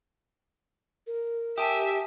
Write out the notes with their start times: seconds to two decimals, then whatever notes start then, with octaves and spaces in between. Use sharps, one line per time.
1.07 A#4
1.58 G4 E5 G#5 A5 D#6